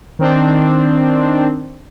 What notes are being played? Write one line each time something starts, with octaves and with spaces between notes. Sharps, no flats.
D#3 C4 D4